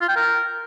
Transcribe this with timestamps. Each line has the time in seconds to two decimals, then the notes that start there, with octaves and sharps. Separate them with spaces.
0.01 F4
0.09 G5
0.16 A#4